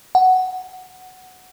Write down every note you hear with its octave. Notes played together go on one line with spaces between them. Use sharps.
F#5